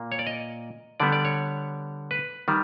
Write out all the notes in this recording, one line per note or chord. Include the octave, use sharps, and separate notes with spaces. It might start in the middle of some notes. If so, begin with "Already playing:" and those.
Already playing: A#2 A#3
C#5
D5
D#5
D3 G3 B3 D5
D5
C#5
B4
D#3 G3